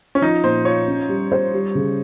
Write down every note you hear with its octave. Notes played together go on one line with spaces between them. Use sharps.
C#4
F3 D#4
A#2 C5
F4 C#5
C#4
G3
C5
G3
C#3